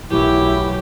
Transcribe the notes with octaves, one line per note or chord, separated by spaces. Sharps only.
B1 F#2 E3 A3 E4 G4